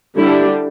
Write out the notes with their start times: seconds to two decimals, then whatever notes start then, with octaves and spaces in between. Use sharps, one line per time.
0.16 D3 G3 D4 E4